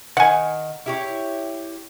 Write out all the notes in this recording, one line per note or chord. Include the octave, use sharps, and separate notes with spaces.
D#3 F#5 G#5
E4 G4 C#5